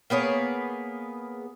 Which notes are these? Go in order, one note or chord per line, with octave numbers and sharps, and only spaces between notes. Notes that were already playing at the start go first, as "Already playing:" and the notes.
A#3 B3 G#4 C#5